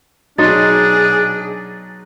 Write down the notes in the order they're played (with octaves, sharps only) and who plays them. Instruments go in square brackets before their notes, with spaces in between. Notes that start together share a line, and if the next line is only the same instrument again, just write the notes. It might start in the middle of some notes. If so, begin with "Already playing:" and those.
[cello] B2 G#4 [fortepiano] F#3 D#4 C6 [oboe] D4 [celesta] A6